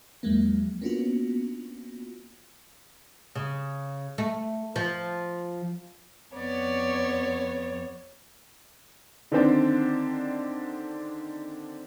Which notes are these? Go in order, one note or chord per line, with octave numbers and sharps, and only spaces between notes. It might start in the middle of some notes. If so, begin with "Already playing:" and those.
E2 F3 F#3 G#3 A#3
A#3 B3 C#4 D4 F4 F#4
C#3
A3
F3
F2 B3 C#5 D5
D3 D#3 C4 D4